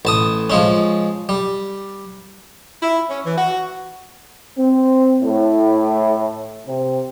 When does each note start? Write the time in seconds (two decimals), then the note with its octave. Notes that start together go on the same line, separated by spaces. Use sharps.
0.05 A1 A5 D#6
0.50 F3 G#3 C#4
1.29 G3
2.83 E4
3.09 C#4
3.26 E3
3.38 F#4
4.58 C4
5.21 A2
6.67 C3